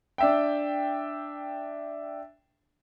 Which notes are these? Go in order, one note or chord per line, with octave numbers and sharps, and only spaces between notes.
D4 E5 G5